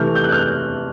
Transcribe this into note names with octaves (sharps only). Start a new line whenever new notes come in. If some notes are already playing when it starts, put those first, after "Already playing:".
Already playing: C3 E3 A3 F6 G6
G6
F#6
F6 G6